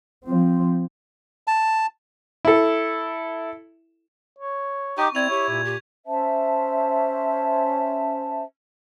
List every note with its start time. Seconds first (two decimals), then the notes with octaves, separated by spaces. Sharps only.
0.25 F3 C4
1.47 A5
2.45 E4 A4
4.39 C#5
4.98 D#4 G4 C#6 D6
5.15 C4 E4 D5 G#6 F7
5.30 G4 C#5
5.50 A#2
5.65 G4
6.06 C#4 C5 E5 A5